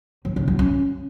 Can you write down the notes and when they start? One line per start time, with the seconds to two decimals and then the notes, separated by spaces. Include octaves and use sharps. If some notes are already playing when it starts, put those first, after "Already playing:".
0.25 F#3
0.36 C#3
0.48 F#3
0.59 C#4